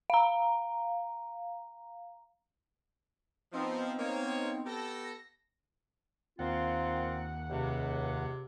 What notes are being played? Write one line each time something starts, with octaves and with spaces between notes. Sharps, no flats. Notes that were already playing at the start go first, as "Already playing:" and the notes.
F5 A#5
F3 B3 C4 D#4
A#3 C#5
B3 G4 A4 A#6
D#2 A#3 C4 F4 F#5
C#2 C3